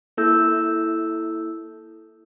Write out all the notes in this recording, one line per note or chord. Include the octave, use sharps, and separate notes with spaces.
A#3 E4 A4 E6 G6